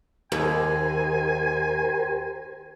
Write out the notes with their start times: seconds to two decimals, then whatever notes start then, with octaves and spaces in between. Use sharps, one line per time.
0.32 D#2 G4 A#4 C5 G#5